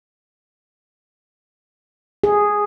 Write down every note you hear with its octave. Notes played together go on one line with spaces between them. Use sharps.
G#4